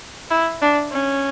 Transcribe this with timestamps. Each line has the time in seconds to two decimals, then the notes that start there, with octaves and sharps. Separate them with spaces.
0.31 E4
0.62 D4
0.92 C#4